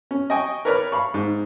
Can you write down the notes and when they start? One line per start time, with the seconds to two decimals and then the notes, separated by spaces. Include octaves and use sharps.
0.11 C#4
0.30 D#5 G5 G#5 C#6 D#6
0.65 A#4 B4 C#5 D5 B5 F6
0.92 F5 B5 C#6
1.14 G#2